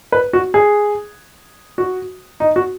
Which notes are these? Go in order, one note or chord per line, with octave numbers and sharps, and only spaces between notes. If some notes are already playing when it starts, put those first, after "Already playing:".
B4
F#4
G#4
F#4
D#4
F#4